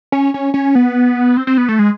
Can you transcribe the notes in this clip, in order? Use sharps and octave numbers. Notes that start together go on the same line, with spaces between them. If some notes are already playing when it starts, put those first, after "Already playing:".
C#4
C#4
C#4
B3
C4
C4
B3
A3
G#3